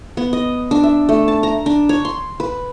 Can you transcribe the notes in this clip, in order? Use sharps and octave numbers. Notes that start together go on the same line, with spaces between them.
B3
D#5
D4
E5
A3
A5
A#5
D4
C#5
C6
B4